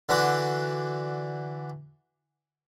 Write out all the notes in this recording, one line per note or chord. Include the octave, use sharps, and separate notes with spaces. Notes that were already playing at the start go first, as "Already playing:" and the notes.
D3 E3 D4 F#4